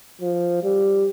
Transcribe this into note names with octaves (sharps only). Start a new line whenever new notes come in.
F3
G3